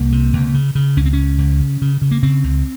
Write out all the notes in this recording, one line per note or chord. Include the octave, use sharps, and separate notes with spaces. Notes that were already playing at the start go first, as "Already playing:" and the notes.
Already playing: C2 A#3
C3
C#2
C#3
C#3
C#2 C#4
C4
C#4
C#2
C#2
C#3
C#3
C#3
A#3
C#3 C4
C#2